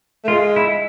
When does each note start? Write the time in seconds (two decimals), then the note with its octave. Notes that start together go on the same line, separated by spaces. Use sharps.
0.24 A3
0.28 G#3 F4
0.56 E4